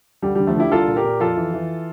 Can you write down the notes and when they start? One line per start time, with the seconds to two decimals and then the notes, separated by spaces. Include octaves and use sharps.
0.22 D2 G3
0.35 D3 G3
0.47 F3 A3
0.56 D3 E4 G4
0.72 C2 F4 A4
0.88 A#2
0.96 G4 A#4
1.04 A#2
1.20 F2 F4 A4
1.37 E3
1.54 E3